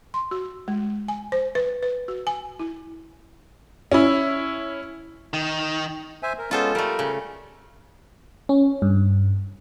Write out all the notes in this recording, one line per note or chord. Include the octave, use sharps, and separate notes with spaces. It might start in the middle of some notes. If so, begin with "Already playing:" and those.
C6
F#4
G#3
G#5
C5
B4
B4
F#4
G#5
E4
C#4 E4
D#3
C5 E5 G#5
A#4
G#3 B3 C#4 F4 A4 C5
G3 A3 A#4
C#3
C#4
G2